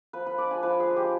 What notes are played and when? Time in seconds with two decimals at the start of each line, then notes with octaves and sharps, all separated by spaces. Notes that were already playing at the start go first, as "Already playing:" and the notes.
0.13 F3 B4
0.26 B4
0.38 G#3 D4 D5
0.51 G#5
0.63 F3 B4
0.80 G#4
0.88 G#3 D4
0.96 G4